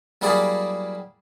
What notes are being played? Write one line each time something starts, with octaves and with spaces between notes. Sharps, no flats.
F#3 G3 A#3 E4 G#4 D5